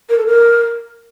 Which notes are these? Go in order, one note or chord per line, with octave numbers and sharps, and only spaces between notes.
A#4
A4
A#4